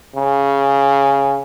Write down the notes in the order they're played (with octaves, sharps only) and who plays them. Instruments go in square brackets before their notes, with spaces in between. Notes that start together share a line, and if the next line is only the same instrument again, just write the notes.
[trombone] C#3